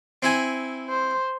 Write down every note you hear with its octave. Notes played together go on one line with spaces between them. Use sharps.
C4 E4 G#5
C5